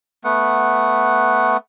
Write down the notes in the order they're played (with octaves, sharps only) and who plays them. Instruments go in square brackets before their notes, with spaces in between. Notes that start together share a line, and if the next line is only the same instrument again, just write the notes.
[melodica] A3 B3 F#5